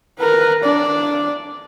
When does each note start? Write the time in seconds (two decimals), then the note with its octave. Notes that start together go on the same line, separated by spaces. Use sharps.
0.19 A#4 B4
0.63 D4 D5